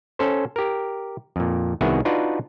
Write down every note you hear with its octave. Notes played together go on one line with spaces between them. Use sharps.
C#4 A4 C5
G4 A#4
F2 A#2
C2 D#3 B3 E4 F#4 G#4
D4 D#4 F4 F#4 B4 D5